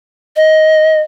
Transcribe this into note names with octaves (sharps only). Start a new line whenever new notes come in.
D#5